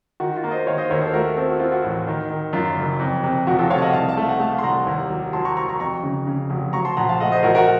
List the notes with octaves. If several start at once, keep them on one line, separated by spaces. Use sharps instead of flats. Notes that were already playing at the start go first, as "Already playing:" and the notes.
D#3 F#4
F4
A#3
C5 D#5
D#3 C#5 F5
C5 D#5
D#2 A#4 C#5
A4 C5
A3 F#4 A#4
C4 A4
F#4
C4 F4
F#4
A1
D#3
D#3
F#2 F4
F#1
F2
C3
F1 F#4
F4 A4
C3 C#5 F5
A5
D#5 F#5
C2 F5 A5
F5 A5
A3
F#5
A3 F5 A5
C6
C2 F#5 A#5
D#2
F#3
F#3 A5 C6
A#5 C#6
F#3 A#5 C#6
A#5 C#6
F2 A#5 C#6
C#3
C#3
F1
F#3 A#5 C#6
A5 C6
A#1 F#5 A#5
F5 A5
A3 D#5 F#5
C5 D#5
A#1 F#4 A#4
F#4 A#4